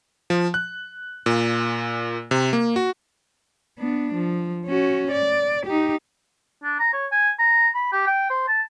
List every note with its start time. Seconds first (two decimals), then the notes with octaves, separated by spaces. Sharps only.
0.30 F3
0.54 F#6
1.26 A#2
2.31 C3
2.53 A#3
2.76 F#4
3.79 B3 D4
4.14 F3
4.67 C#4 F#4
5.12 D5
5.66 D#4 G4
6.64 D4
6.79 A#5
6.93 C#5
7.12 G#5
7.39 A#5
7.74 B5
7.92 G4
8.07 G5
8.30 C5
8.48 A5